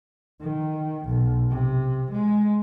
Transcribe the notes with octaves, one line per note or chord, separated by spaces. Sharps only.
D#3
B1
C3
G#3